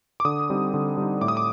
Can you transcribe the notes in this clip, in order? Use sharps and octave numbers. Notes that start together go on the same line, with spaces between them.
D6
D3 D#6
G3 C4 D#4
D3
G3 C4 D#4
A2 D6
D#6
D6